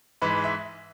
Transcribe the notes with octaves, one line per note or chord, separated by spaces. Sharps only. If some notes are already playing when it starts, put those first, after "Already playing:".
G#2 E3 G#3 B4
E5